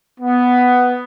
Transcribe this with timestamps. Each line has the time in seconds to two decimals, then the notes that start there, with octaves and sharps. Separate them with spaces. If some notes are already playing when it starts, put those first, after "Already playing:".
0.20 B3